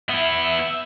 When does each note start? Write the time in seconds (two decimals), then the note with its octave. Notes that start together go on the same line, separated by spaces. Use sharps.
0.09 B3 E4 E5